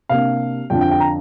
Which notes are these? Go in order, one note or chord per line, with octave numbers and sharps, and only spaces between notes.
C3 A#3 D4 F5
F2 D3 F3 D4 G5
G5
G5
A#5